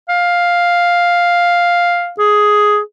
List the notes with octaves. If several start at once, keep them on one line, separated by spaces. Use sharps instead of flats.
F5
G#4